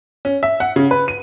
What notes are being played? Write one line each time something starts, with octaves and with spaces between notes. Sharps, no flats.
C#4
E5
F#5
C#3
B4
D#7